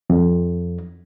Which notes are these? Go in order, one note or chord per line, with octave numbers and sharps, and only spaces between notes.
F2